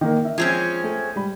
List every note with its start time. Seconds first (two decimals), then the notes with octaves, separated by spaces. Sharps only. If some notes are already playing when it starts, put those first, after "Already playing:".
0.01 D#3 A#3 A#4
0.25 E5
0.38 F3 G#3 C4 C#4
0.84 A3
1.16 G3 B5